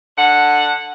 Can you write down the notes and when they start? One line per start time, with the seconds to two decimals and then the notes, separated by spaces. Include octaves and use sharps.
0.17 D3 F#5